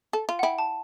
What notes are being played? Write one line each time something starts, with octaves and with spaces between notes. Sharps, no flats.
A4
F4
F#5
E4 G5
A5